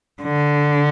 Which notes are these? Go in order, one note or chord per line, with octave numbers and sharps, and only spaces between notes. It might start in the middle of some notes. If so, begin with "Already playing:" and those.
D3